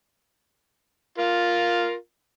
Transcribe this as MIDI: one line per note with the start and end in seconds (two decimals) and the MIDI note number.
1.18 1.94 65
1.18 1.94 70